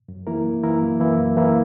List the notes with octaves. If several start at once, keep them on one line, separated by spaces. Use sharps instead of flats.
F#2
E3 A#3 E4 A#4
F#2
E3 A#3 E4 A#4
F#2
E3 A#3 E4 A#4
F#2
E3 A#3 E4 A#4